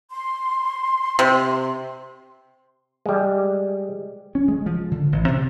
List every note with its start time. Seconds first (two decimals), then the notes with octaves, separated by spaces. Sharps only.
0.10 C6
1.19 C3
3.06 G3 G#3
4.35 C#4
4.48 G#3
4.66 F3
4.91 D3
5.12 A1
5.28 C3